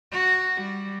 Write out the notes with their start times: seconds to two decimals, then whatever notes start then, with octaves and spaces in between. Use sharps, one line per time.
0.12 F#4
0.62 G3